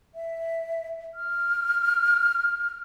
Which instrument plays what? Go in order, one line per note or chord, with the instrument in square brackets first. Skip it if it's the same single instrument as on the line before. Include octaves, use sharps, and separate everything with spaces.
[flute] E5
F6